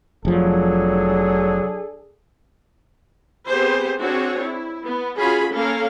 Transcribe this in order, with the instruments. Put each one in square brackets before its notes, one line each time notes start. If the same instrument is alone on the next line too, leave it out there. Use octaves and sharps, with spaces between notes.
[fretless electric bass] F1 F3 [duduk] F#3 [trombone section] D4 G#4 A4
[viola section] B3 C4 G4 G#4 C5
C4 D4 F#4 G#4 C#5
E4
B3
C#4 F4 F#4 G#4 G#5 B5
A#3 C#4 A4 A#4 F5